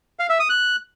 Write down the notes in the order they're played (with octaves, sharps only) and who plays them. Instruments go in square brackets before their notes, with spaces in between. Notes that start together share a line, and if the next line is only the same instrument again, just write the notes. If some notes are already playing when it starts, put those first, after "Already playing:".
[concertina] F5
E5
D#6
F#6